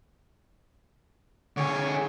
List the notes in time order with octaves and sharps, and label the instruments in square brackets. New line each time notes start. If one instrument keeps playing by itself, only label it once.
[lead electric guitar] D3 G#4 [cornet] C#5